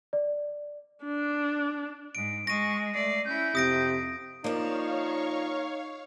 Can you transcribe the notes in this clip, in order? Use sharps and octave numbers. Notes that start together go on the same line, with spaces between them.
D5
D4
G#2 D7
G#3 C#6 A#6 D#7
A3 D5 C7
C#4 E4 G6
F2 C3 D#6 A#6 D7
F3 A#3 D4 D#4 C#5 F5 C#6